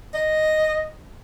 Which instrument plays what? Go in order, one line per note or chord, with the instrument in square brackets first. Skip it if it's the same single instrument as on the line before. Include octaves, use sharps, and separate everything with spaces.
[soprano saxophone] D#5